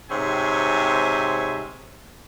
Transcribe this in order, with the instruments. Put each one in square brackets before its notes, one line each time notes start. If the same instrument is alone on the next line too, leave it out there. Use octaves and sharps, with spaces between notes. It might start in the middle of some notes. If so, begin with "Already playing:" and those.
[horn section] G#2 C3 C4 C#5 E5 G#5